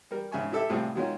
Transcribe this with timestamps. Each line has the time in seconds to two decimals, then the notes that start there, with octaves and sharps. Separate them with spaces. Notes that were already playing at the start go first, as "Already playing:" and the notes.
0.11 G3 A#4
0.32 G#2 C#3 E5 G#5 C#6
0.52 E4 G4 A4 E5
0.70 A2 C3 G3 C4 F4 G#4
0.95 D#3 F#3 G#3 A#3 C#4 F4